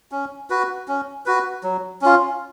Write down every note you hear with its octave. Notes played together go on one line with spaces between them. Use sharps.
C#4
F#4 B4
C#4
F#4 B4
F#3
C#4 F4